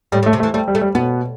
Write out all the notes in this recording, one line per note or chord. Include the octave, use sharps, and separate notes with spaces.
A2 G3
A2
A3
C3
A3
E3
G3 A3
G3
A3
G3
B2 B3